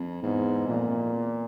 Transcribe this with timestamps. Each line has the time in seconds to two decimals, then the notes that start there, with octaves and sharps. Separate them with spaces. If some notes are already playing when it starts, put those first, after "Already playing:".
Already playing: F2
0.23 E2 G#2
0.67 F2 A#2
0.90 F2
1.13 E2